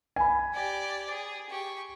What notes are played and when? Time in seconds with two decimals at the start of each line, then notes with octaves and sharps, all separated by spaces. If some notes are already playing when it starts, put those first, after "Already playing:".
0.16 G#5 B5
0.54 G4 D5
1.09 G#4
1.50 G4 C#6